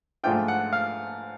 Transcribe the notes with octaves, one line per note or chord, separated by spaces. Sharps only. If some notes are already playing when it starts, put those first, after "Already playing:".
G#2 F3 A3 D4 F4 G5
F#5
F5